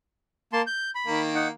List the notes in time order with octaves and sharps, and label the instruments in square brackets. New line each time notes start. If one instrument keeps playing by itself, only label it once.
[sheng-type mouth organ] A#3 A5 C6
G6
B5
[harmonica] D#3 A#3
[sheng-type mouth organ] D#4 F#5